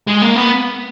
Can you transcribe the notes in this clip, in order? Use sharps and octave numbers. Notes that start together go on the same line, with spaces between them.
G#3
A#3
B3